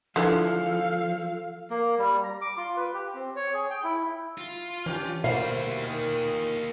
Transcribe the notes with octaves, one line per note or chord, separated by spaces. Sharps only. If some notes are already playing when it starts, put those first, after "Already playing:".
D3 E3 F3 G#3 A4 F5
A#3
G3
A#5
D6
F4
B4
G4
C4
C#5
G#4
G5
E4
F4
E3 C#4 D4 G4
B2 G3 A#3 B3 G4 C5 F5
A#2 D#3